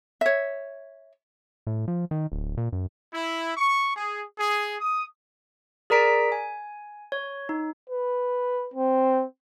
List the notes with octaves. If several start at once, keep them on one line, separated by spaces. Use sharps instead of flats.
C#5 E5
A2
F3
D#3
D1
A#2
F#2
E4
C#6
G#4
G#4
D#6
G#4 A#4 D5 A#5 B6 D7
G#5
C#5
D#4
B4
C4